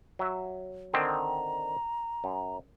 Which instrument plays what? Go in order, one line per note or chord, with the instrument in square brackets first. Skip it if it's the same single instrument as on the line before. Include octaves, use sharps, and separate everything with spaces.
[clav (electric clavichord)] F#3 E5
[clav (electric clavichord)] D3 D#3 C4 [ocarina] A#5
[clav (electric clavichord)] F#2